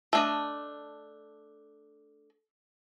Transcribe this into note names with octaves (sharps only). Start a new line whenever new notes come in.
A3 D4 D#5